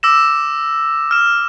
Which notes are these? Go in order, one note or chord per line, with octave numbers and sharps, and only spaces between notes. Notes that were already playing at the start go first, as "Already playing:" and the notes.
D6 E6 A#6 E7
F6 E7